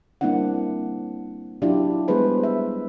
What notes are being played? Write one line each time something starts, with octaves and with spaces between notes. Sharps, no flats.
G3 A#3 C4 D4 E4 F#5
F#3 D4 E4 F4 G4
G3 G#3 B3 G#4 B4 C5
E5